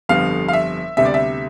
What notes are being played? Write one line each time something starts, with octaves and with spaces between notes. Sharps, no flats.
G1 F2 D3 G3 B3 F5
F5
E5
D2 C3 G3 B3 E5
D5
E5